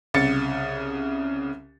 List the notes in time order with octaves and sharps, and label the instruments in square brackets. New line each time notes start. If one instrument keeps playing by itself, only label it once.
[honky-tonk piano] C2 C#3 A6 C#7